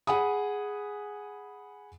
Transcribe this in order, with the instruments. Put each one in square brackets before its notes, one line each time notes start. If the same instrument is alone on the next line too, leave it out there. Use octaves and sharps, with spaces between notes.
[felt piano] G#4 F#5 G#5 B5 D#6